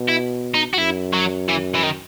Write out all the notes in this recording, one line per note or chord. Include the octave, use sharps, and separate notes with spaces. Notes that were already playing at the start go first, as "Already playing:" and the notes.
Already playing: B2
E4
D#4
F#4
F#2 E4
F#3
E3
E3
D#3